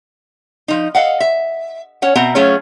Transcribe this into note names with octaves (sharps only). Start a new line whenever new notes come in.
F3 D#4
A4 D#5 F5 F#5
E5
C#4 C#5 F#5
B2 C4 E5 F#5 A#5
F#3 A3 C#4 F4 G#4 C#5